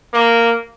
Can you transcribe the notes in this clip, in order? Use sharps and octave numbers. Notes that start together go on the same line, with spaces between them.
A#3